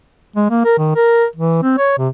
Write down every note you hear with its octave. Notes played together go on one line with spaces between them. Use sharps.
G#3
A#3
A#4
D#3
A#4
E3
C4
C#5
C3